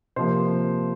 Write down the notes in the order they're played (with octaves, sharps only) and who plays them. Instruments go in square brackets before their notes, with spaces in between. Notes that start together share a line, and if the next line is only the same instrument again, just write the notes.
[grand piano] C3 F3 A#3 C5